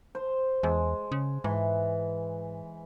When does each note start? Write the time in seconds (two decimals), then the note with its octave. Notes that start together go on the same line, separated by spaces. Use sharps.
0.15 C5
0.63 E2 G#3
1.12 C#3
1.44 G#2 E3